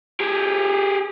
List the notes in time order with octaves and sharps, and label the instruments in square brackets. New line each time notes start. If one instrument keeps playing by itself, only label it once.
[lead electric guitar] G4 G#4